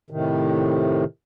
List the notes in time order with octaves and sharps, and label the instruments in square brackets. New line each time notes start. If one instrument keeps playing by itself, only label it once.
[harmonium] A2 C3 D#3